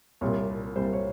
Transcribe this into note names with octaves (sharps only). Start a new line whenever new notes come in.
C2 A#2 G3 C#5
C2 A#2 G3 C5
C#5